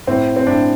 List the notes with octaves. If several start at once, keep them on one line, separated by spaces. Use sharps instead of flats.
A2 C4
C4
A2 D4